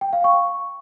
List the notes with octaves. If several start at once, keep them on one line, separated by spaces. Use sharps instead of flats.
G5
F5
C#6